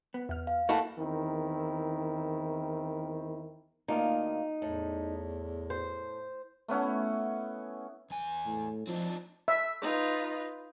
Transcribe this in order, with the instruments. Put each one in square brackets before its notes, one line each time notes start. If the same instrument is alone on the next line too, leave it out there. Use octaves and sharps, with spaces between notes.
[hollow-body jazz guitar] B3
[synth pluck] E2 F6
[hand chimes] F5
[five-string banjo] E3 A3 F#4 [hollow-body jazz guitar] A#3 A4
[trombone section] E2 D#3 C4 E4 A#4
[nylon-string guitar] D2 A#3 F4 [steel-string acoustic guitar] D#4
[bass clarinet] E2 [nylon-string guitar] A2
[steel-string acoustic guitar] C5
[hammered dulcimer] A3 B3 C#4 E4
[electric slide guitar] E2 G#5
[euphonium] A2
[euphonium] F3 [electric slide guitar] C4 D4 D#4
[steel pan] E5
[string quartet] D#4 F4 B4